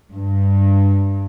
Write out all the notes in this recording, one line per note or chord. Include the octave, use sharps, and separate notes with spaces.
G2